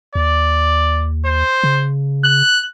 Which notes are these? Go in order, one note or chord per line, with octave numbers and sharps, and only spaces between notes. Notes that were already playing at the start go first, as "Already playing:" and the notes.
D#2 D5
C5
C#3
F#6